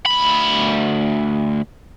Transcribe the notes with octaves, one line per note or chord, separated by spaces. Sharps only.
D2 B5